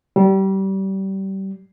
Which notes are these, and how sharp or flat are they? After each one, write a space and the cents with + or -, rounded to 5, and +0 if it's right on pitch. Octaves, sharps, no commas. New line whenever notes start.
G3 -25